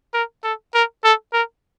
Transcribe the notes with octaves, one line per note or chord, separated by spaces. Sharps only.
A#4
A4
A#4
A4
A#4